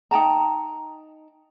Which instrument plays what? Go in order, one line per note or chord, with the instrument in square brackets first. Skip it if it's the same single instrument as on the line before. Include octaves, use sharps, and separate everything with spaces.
[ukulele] D#4 G5 A5 A#5